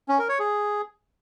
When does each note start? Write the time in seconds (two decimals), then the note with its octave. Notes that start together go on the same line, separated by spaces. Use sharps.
0.08 C#4
0.19 A#4
0.29 C#5
0.39 G#4